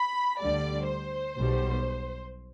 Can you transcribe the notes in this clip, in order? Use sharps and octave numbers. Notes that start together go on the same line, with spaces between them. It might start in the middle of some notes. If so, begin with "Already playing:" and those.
Already playing: B5
D2 D3 G3 D5
C5
B1 B2 G3